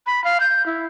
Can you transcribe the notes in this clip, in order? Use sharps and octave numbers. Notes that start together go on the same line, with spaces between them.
B5
F5
G6
E4